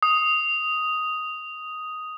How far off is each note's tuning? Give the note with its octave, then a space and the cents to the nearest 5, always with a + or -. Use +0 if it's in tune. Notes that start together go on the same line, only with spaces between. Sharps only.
D#6 +5